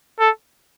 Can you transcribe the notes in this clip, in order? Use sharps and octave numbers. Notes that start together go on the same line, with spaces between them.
A4